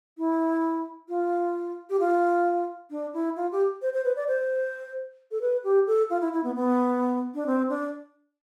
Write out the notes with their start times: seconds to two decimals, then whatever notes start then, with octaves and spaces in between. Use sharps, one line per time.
0.18 E4
1.09 F4
1.90 G4
2.00 F4
2.90 D4
3.13 E4
3.36 F4
3.52 G4
3.82 C5
3.93 C5
4.04 B4
4.16 D5
4.27 C5
5.31 A4
5.41 B4
5.64 G4
5.87 A4
6.10 F4
6.21 E4
6.33 E4
6.44 B3
6.55 B3
7.34 D4
7.46 C4
7.69 D4